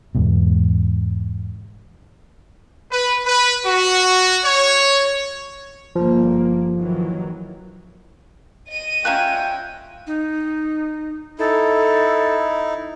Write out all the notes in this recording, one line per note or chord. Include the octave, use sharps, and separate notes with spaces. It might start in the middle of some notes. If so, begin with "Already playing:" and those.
E2 G#2 B2
B4
B4
F#4
C#5
G1 F3 A#3
D#3 E3 F#3
D#5 D#7
C#4 F4 E5 G5 G#5 A#5 F#6
D#4
D#4 E4 A4